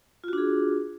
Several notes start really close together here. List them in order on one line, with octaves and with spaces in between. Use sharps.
F4 F#4 D4 G#4